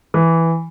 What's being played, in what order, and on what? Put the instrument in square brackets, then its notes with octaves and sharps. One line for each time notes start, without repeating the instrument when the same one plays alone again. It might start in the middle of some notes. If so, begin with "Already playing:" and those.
[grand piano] E3